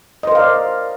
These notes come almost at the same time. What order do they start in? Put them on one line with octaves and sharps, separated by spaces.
D#5 C5 A#4 F5 D5